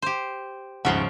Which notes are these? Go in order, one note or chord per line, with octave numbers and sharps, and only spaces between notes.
G4 C5
D#1 G#2 C#3 F3 E5 F#5 C6